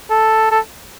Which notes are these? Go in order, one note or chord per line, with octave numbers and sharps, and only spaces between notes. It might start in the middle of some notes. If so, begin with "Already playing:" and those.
A4
A4